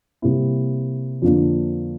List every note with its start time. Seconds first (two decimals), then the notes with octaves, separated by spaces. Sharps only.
0.22 C3 G3 A#3 E4
1.22 F2 D3 F3 A#3 D4